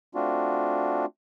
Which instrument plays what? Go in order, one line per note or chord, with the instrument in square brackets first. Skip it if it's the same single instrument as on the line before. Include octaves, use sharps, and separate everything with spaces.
[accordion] A3 C4 D4 F4 F#4